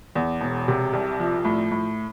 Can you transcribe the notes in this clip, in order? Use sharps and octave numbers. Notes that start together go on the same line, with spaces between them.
E2
E1
C3
C2
F3
A2
A2